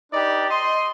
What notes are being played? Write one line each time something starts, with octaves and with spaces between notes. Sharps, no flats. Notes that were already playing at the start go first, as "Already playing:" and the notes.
D4 D#4 G4 B4 D5
D#5 C6